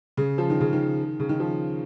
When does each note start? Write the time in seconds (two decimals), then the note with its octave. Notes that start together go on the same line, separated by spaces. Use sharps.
0.17 C#3
0.38 F3
0.50 D#3
0.61 C#3
0.73 D#3
1.20 C#3
1.29 D#3
1.40 F3